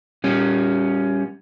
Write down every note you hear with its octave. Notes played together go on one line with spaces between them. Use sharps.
G3 C#4